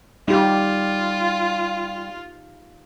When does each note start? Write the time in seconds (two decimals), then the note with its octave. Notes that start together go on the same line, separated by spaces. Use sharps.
0.28 G3 D#4 F4 G4